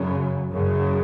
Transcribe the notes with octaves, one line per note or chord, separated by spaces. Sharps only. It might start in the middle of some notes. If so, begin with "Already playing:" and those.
Already playing: F#2 C#3
F#2 C#3